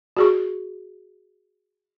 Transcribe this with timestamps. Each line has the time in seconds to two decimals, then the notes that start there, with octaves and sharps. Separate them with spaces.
0.17 F#4 G#4 C#6